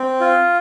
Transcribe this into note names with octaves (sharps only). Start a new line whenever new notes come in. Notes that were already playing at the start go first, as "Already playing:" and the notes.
Already playing: C4
F4